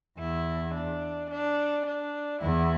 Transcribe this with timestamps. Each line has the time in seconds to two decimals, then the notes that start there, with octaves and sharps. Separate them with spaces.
0.19 E2 E4
0.74 D4
1.30 D4
1.86 D4
2.42 E2 E4